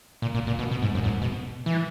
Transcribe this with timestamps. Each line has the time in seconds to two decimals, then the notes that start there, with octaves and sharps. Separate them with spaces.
0.22 A#2
0.35 A#2
0.47 A#2
0.59 B2
0.71 B2
0.82 G#2
0.95 F#2
1.04 G#2
1.21 B2
1.66 E3